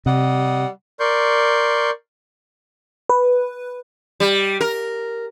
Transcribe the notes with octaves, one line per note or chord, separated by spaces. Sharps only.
C3 G3 D#5 F#5
A#4 D5 C6 C#6 G6
B4
G3
A#4